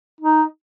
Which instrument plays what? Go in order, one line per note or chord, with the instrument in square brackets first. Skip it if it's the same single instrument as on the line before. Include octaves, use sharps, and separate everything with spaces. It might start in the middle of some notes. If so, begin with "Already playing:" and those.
[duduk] D#4